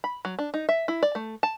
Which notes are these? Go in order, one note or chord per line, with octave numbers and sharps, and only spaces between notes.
B5
F#3
D4
D#4
E5
E4
D5
A3
A5